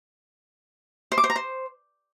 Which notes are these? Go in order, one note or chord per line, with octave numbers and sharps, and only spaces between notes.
C5
D6
C5
A#5
C5